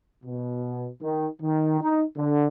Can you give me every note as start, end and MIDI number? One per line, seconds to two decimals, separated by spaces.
0.24 0.87 47
1.01 1.27 51
1.42 1.80 51
1.81 2.03 63
2.16 2.45 50